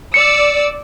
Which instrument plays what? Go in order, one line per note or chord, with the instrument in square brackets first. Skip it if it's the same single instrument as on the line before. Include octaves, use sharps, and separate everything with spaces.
[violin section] D5 E6 [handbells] C#7